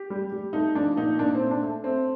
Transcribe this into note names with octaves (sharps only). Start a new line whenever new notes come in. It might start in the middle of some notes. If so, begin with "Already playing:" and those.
Already playing: G4
G3
G3
A3 D#4
F3 D4
A#2 D#4
A#2 D4
C4
A3
D4
A3
A3 C4